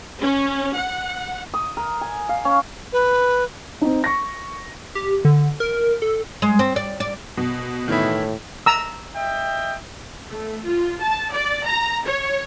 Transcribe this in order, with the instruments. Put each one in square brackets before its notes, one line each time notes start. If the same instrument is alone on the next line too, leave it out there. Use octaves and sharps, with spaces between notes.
[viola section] C#4
F#5
[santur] D#6
A#4
G#5
F5
C#4
[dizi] B4
[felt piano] C4 D#4
C#6 A#6
[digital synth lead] G4
D3
A#4
A4
[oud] G#3
C4
D5
D5
[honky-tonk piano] B2
[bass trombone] A2 [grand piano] D#3 E3 E4
[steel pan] A#5 E6
[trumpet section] D#5 E5 G5
[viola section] A3
F4
A5
D5
A#5
C#5